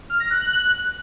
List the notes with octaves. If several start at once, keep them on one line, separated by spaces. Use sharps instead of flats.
F6
A#6
F#6